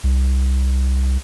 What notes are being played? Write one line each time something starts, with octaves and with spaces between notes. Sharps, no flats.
C2